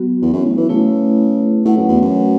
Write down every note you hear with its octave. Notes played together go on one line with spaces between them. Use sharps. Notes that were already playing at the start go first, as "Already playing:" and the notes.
Already playing: F#3 B3 F#4
E2
F#2
A2
E3
C#3 A3 E4 B4
A2 A3 F#4 B4 F#5
F#2
E2
F#2